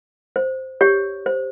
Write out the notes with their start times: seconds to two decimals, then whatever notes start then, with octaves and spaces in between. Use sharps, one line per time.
0.36 C5
0.81 G4 C#5
1.26 C5